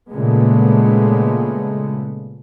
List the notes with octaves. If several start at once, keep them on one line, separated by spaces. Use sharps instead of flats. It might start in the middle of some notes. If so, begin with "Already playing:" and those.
A#2 C#3 G#3 A3 B3